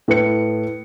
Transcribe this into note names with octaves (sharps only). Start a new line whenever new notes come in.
A2 B4 C#7